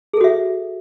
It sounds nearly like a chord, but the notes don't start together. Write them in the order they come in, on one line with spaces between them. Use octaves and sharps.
G#4 A4 F#4 E5